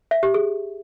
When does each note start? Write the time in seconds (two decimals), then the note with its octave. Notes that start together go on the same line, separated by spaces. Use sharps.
0.11 E5
0.23 G4
0.34 G#4